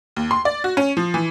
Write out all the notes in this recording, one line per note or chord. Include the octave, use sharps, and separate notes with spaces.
D#2
C6
D5
F#4
C#4
F3
E3